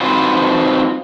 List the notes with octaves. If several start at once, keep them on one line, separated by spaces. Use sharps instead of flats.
C4 D#4 F4 F#4 B4 C5